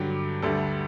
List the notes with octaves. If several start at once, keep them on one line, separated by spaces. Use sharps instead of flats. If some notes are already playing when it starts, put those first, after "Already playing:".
Already playing: G2 D3 F#3 G4
D2 D3 G3 A4